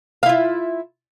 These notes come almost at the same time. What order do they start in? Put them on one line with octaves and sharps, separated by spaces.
F5 E4 F4